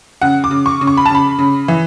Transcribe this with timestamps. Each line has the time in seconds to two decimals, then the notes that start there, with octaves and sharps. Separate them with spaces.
0.22 C#3 F#5
0.44 D6
0.51 C#3
0.66 C#6
0.81 C#3
0.87 C#6
0.97 B5
1.06 A5
1.10 C#3 B5
1.38 C#3
1.68 E3